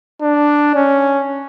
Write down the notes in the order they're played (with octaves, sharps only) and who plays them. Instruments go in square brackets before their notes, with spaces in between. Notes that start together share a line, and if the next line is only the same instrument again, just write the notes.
[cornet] D4
C#4